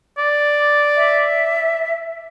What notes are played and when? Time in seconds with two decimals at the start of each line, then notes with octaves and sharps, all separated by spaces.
0.18 D5
0.96 E5